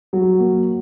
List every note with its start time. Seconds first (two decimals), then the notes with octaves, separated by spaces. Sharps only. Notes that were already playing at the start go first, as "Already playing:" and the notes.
0.13 F#3 F#4
0.40 A#3